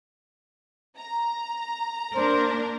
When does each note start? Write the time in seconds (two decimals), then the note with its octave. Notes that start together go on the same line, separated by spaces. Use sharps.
0.97 A#5
2.15 A#3 D4 A#4 C5